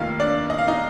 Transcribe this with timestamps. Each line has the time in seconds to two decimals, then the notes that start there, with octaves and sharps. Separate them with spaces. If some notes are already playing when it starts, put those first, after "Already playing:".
Already playing: F1 D#2 D#3 F4 F5
0.20 D4 D5
0.50 D#5
0.58 F5
0.67 D#4 D#5